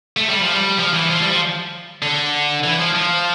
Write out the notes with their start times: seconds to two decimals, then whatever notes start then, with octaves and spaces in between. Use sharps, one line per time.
0.17 A3
0.29 G3
0.41 F3
0.53 G3
0.79 F3
0.93 E3
1.10 F3
1.20 G3
1.30 F3
2.02 D3
2.64 E3
2.79 F3
2.95 F3